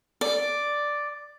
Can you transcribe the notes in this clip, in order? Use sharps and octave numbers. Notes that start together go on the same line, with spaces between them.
D5